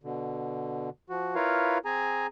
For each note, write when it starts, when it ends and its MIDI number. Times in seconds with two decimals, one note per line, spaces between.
0.03 0.89 47
0.03 0.89 50
1.10 1.35 53
1.10 1.35 66
1.35 1.78 64
1.35 1.78 65
1.35 1.78 70
1.35 1.78 71
1.35 1.78 73
1.35 1.78 77
1.85 2.27 60
1.85 2.27 68
1.85 2.27 80
1.85 2.27 82